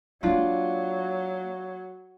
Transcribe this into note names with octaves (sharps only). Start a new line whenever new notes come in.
F#3 G#3 A#3 D4 F4